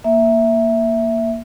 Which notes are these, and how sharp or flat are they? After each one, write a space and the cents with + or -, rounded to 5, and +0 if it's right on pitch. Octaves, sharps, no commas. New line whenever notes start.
A#3 +0 E5 +0